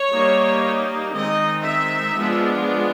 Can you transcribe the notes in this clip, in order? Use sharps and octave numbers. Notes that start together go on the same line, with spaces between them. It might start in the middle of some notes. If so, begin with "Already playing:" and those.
Already playing: C#5
G3 A#3 D#4
D#3 G#3 C4 D#4 D#5
E5
F3 G#3 B3 D4 F4